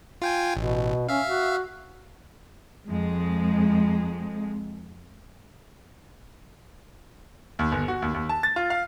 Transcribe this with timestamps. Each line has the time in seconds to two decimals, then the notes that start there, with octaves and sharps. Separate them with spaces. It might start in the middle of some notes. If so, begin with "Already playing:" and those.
0.22 F4 G5 G#5
0.56 A1 B2
1.09 C#4 E5 F5
1.27 F#4
2.89 F2 G#3
7.59 D#2
7.72 G1
7.88 F#4
8.02 D#2
8.14 D#2
8.29 A5
8.43 A6
8.56 F4
8.70 F5